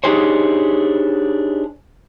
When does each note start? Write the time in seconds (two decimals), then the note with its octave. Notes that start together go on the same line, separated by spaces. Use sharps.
0.04 D4 D#4 G4 G#4 C5 C#5